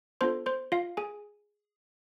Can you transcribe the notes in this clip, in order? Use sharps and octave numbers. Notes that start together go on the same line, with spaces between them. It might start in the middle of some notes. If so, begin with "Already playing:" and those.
B3 D4 F4 A4 C5 C6
C5 C6
F4 F5
G#4 G#5